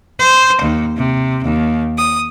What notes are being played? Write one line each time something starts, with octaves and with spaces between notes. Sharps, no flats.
C5
D#2
C3
D#2
D#6